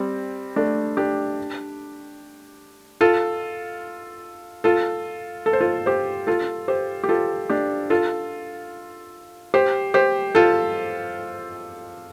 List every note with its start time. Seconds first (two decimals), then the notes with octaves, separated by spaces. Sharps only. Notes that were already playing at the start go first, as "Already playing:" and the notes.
Already playing: G3 C4
0.56 A3 D4
0.97 D4 G4
3.01 F4 A4
4.64 F4 A4
5.46 A4
5.53 C5
5.61 F4 A4
5.86 G4 C5
6.27 F4 A4
6.68 G4 C5
7.04 G4
7.09 F4 A4
7.50 D4 G4
7.90 F4 A4
9.54 G4 C5
9.94 G4 C5
10.35 F4 A4